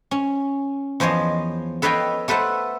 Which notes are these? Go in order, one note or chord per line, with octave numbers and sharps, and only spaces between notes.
C#4
E2 F3 C5 C#5 D#5
A4 B4 C#5 D#5 F5 G5
A3 A4 B4 C5 F#5